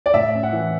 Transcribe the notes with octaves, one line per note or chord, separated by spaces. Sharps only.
D5
A2 E5
C#4
F#5
E3